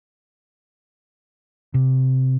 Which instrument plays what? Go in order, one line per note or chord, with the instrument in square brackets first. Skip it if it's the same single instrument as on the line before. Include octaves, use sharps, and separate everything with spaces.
[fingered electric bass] C3